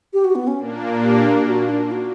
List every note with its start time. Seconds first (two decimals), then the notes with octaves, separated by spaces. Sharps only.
0.13 G4
0.24 F#4
0.35 B3
0.47 C#4
0.58 A#2 A#3 D4
1.03 G4
1.47 F#4
1.69 D4
1.92 F#4